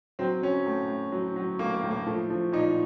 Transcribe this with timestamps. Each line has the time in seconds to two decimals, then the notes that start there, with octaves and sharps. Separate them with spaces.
0.19 F#3 C4
0.42 F#3 C#4
0.66 A2
0.89 A2
1.12 F#3
1.36 F#3
1.59 A2 A#3
1.75 A#3
1.83 A2
1.91 A#3
2.06 F3 A3
2.30 F3
2.52 A#2 D#4